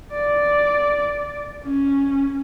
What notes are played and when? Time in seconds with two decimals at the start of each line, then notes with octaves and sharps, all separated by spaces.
0.12 D5
1.64 C#4